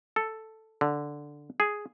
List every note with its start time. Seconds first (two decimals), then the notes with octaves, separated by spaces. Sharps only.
0.16 A4
0.81 D3
1.60 G#4